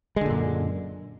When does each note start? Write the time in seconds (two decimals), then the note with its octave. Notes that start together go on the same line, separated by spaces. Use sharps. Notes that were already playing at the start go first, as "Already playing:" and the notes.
0.16 G#3
0.21 D3
0.26 A#2
0.30 F#2